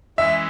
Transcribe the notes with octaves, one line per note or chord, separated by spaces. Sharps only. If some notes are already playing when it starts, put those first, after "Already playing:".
E3 G#3 C#4 E4 E5